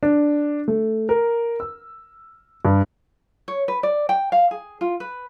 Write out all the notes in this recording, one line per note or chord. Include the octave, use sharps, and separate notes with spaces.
D4
A3
A#4
E6
G2
C#5
B4
D5
G5
F5
G#4
F4
B4